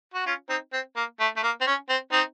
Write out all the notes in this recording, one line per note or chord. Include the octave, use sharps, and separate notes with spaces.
F#4
C#4 F4
C4 D#4
C4
A#3
A3
A3
A#3
C4
C#4
C4
C4 D#4